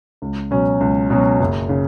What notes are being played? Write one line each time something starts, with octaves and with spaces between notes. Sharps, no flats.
C#2
B2 F#3 C#4
C#2
B2 F#3 C#4
F#1
C#3